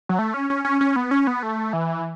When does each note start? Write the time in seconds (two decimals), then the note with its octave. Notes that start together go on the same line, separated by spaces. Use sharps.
0.09 F#3
0.19 A3
0.34 C#4
0.50 C#4
0.65 C#4
0.81 C#4
0.96 B3
1.11 C#4
1.27 B3
1.43 A3
1.73 E3